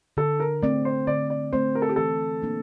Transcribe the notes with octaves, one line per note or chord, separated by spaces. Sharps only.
D3 A4
A#4
A3 C4 D5
C5
D3 D5
D5
A3 C4 C5
A#4
A4
G4
E3 A4
A#3 D4